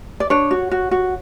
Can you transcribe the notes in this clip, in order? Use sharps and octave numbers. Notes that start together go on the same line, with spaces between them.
D5
D4 C#5
F#4
F#4
F#4